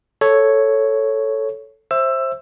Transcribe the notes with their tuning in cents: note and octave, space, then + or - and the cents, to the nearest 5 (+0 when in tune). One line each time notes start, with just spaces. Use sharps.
A4 +0 C#5 +0
C5 +20 E5 +0 E6 +15